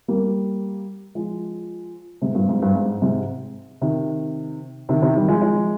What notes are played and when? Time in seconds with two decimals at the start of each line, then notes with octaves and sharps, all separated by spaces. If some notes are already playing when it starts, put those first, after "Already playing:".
0.08 G3 A#3
1.15 F3 G#3
2.22 G#2 C3
2.35 G2 A#2
2.49 G#2
2.62 G2
2.75 G#2
3.02 G#2 C3
3.82 C3 D#3
4.89 C3 D#3
5.02 C3 D#3
5.16 D#3 G3
5.28 F3 G#3
5.42 F3 G#3